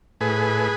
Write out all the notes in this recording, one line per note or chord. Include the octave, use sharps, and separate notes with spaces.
A2 G#4 B4